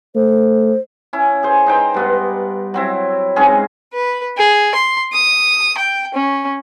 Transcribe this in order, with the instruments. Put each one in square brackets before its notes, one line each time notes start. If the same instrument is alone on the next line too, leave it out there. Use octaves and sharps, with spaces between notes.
[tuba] A3 [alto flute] C5
[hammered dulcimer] C#4 E4
G#4 C5
D#4 C5 G5 A#5
G2 B3 F4
F#3 C4 E4
G#2 C4 C#4 G#4
[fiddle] B4
G#4
C6
D#6
G5
C#4